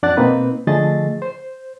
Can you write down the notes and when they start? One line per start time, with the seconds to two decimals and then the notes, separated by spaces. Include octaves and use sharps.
0.03 F2 D4 D5 F#5 F#6 A6
0.17 B2 A#3 C4 D#4 B4
0.67 D3 F3 A3 G#4 D#5 A6
1.22 C5